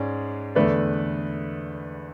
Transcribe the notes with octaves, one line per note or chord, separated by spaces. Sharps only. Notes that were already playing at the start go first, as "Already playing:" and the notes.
Already playing: G#2 G#3 C#4 D5
E2 D3 A3 B4 D5